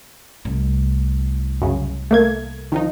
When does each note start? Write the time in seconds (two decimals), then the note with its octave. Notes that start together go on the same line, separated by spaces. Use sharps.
0.45 C2 A2
1.62 F#2 C#3
2.11 A3 A#3 G#6
2.72 D#3 F3 D#4